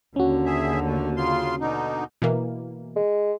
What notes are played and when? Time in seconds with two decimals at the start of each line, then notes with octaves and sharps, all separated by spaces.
0.16 D#2 D3 C#4 F#4
0.46 G#4 E5
0.86 A3
1.17 C#3 F4 C6
1.61 B2 D3 D#4
2.22 B2 E3 A#3
2.96 G#3